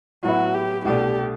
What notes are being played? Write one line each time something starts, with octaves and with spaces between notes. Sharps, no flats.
A2 F#3 B3 E4 F#4
G4
C2 B2 A3 D4 G4